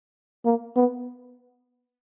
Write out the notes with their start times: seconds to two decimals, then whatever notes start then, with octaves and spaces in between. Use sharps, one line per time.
0.46 A#3
0.76 B3